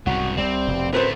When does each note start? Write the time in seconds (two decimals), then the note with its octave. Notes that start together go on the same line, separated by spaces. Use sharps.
0.06 C2 G#2 C#3 F#3 F#4
0.38 C2 G3 C4
0.68 F1 F2 B2
0.93 F#2 A2 D3 A3 C4 B4 C5